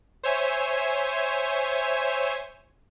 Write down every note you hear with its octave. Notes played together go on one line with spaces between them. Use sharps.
C5 C#5 E5 G#5